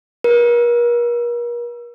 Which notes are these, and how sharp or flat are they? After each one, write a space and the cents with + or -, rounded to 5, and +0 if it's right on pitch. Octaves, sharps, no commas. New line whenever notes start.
A#4 +40